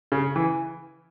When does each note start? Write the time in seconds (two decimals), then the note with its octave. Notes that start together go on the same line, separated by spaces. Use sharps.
0.12 C#3
0.36 E3